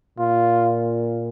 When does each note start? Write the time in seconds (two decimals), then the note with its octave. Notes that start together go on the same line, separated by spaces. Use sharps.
0.19 A#2 F4